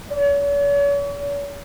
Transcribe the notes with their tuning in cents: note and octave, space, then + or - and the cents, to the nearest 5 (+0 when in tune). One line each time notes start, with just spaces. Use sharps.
C#5 +45